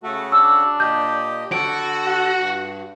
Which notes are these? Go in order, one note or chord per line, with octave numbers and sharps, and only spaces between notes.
C#3 A3 F#4
D4 E6
A#2 G4 D#5 G6
D3 F#4 A4 D7
F#5
G2